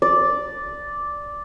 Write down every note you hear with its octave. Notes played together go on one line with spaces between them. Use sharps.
D5